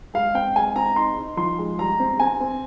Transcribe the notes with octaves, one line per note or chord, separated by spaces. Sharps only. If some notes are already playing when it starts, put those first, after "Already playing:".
G#3 F5
C4 G5
G#3 G#5
C4 A#5
D#4 C6
D#4
F3 C6
G#3
G3 A#5
C4
C4 G#5
C4